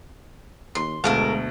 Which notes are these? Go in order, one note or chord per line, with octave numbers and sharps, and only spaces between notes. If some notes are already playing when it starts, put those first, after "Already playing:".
D#2 C6
D2 B2 G#3 A4 A#4 F5